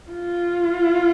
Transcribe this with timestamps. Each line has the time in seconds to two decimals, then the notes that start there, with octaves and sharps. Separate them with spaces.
0.10 F4